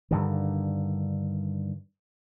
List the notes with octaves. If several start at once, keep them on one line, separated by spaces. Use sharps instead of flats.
G2 D3 D#3